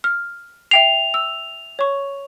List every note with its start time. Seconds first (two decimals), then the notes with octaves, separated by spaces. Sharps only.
0.04 F6
0.71 E5 G5 C7 F7
1.14 E6
1.79 C#5 C#6